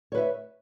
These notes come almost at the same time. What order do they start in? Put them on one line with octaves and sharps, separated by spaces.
C#5 B4 E5